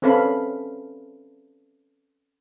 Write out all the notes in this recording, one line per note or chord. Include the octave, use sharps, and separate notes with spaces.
C4 C#4 A4 B4 F5 B5